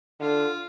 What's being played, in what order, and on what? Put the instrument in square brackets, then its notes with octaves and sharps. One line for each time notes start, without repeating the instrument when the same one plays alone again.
[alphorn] D3 [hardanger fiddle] F4